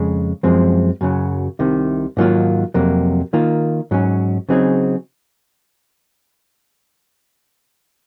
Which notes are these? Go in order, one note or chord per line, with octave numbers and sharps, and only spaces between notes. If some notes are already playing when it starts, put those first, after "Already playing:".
Already playing: F2 C#3 G#3
F#2 F3 G#3 C4
F#2 C#3 F#3
C2 C3 D#3
G#2 D#3 F#3 A#3 F4
F2 C3 F#3 A#3
D#3 A#3 F4
G#2 F#3 C#4
C#3 F#3 C4 D#4 G#4